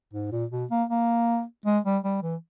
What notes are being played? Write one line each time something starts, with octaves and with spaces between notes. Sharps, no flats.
G#2
A#2
B2
A#3
A#3
G#3
G3
G3
E3